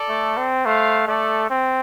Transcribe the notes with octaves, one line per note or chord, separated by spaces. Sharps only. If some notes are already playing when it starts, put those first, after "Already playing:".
Already playing: A4 D5
A3
C4
A3 C5 F5
A3 A4 D5
C4